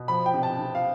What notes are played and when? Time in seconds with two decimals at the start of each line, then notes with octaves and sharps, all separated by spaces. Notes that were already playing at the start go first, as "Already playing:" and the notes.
Already playing: B2
0.08 F3 B5
0.26 G5
0.34 C3
0.43 A5
0.59 C3
0.75 F5